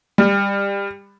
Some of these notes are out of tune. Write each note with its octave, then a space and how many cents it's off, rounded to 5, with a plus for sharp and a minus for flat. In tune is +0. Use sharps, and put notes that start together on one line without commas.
G3 +25